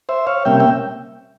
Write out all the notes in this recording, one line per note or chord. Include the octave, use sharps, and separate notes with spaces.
C5 E5
C#5 F5
C3 G3 A#3 C#4 E5 G5
E5 G5